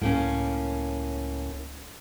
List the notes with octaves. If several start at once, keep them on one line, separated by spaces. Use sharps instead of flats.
C#2 A2 A#3 C#4